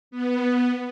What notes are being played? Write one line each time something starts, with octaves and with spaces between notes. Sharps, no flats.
B3